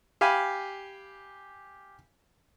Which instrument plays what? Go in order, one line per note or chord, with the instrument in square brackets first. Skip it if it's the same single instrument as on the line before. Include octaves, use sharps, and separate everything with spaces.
[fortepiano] G4 F5 G#5 B5